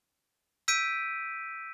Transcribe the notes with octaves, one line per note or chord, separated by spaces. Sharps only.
E6 G6 B6 D7 D#7